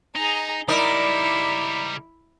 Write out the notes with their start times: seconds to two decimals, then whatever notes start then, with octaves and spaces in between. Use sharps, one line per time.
0.15 D#4 G#4 A#5
0.68 C#2 G3 D#4 E4 A#4 D5